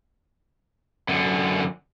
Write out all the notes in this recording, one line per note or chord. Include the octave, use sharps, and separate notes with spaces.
F#2 D3